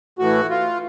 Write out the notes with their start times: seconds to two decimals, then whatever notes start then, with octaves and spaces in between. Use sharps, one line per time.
0.19 A2 E3 F#4
0.50 F4